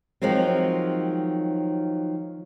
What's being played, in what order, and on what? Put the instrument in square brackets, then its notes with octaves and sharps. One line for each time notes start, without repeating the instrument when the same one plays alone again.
[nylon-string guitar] D#3 F3 F#3 G#3 C4